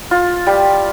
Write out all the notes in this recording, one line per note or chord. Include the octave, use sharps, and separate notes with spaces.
F4
G3